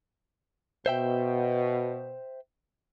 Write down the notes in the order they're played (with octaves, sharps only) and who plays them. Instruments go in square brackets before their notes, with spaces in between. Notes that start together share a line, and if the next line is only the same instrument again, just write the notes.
[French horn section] B2 [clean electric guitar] C5 E5 G5